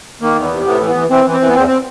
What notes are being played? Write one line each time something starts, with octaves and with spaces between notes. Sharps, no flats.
D#3 A#3
E2
B3
C3
A2 B3
E3
B3
E3
E3 C4
E3
C4
E3
B3
E2 C4
C4